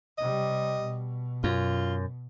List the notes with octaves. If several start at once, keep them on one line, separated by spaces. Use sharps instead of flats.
C3 G3 D#5
B2
F#2 F4